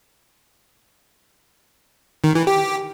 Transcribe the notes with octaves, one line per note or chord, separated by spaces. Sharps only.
D#3
E3
G4